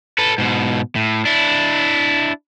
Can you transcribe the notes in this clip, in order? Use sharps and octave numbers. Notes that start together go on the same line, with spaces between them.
A4 B4
G#2 B2
A2
D4 E4